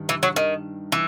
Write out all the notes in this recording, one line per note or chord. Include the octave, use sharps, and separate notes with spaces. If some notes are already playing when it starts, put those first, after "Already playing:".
Already playing: G2 D#3
E3
F#3
D#3
E3